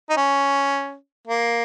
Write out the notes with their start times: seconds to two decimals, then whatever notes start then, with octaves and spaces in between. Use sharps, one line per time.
0.10 D#4
0.17 C#4
1.27 A#3